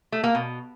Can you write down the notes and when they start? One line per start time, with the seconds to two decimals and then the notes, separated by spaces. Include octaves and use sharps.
0.12 A3
0.24 A#3
0.35 B2